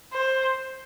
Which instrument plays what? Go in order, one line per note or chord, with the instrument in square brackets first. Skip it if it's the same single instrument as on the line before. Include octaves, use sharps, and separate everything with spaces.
[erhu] C5